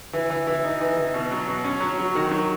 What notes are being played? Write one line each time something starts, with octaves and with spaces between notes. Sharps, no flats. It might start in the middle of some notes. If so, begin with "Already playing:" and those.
E3
E3
E3
D#4
E3
E3
B2
F#3
B2
C#4
F#3
F#3
D#3
F#3